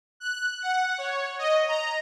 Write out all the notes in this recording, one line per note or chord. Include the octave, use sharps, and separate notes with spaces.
F#6
F#5
C#5
D#5
A#5